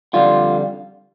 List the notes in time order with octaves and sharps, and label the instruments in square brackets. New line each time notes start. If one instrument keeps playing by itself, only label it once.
[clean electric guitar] F2 D3 G3 F4